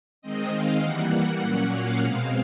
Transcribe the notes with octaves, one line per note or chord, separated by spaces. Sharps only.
D#3 G#3 C4 D#5
F5
E3 G3 A#3 F#5
A#2 F#3 A#3 C#4 F#5
F5
B2 G#3 C4